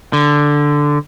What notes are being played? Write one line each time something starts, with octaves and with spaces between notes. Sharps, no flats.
D3